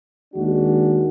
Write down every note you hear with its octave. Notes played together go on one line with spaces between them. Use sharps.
D#2 D#3 G#3 D4 F#4